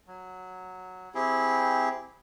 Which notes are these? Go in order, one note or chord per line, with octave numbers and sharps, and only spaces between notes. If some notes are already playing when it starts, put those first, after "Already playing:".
F#3
C4 E4 G4 G#4